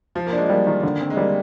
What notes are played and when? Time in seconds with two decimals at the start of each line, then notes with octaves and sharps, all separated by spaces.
0.15 F3 F4
0.26 A#3
0.33 G#3 D4
0.49 G3 A#3
0.67 D#3
0.83 D3
1.01 C4
1.10 G#3
1.17 G3 A#3